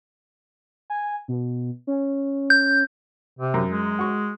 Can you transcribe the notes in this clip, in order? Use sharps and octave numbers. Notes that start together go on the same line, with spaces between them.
G#5
B2
C#4
G6
C3
F#2
G#3
F#4 C#6